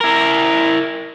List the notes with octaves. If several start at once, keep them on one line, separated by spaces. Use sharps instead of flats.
E4 A#4